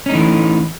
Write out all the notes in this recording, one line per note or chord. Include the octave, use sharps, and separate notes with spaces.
E3 A3 C#4 D#4